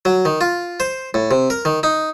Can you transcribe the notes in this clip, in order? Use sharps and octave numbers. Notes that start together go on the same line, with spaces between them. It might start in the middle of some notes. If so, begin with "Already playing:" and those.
F#3
D#3
F4
C5
A2
C3
A#4
D#3
D#4